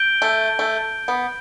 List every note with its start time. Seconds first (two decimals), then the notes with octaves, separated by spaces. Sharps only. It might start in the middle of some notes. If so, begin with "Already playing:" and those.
Already playing: G6 D7 G7
0.22 A3
0.59 A3
1.08 B3